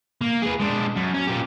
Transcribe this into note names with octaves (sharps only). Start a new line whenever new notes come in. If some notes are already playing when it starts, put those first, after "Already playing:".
A#3
G#4 B4
G#3 D4
F#2
C#4
A#2 G4